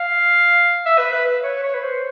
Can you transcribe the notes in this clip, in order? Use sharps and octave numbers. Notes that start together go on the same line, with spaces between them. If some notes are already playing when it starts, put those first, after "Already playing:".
Already playing: F5
E5
B4
B4
C#5
C#5
B4
C5